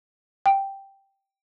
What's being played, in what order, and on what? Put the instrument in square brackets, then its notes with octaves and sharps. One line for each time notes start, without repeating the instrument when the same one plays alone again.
[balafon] G5